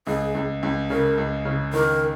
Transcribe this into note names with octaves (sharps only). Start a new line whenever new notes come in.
C#2 G#4
C#2
C#2
C#3 A#4
C#2
C#3
D#3 A#4